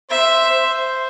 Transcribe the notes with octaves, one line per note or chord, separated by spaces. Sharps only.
C5 E5
C5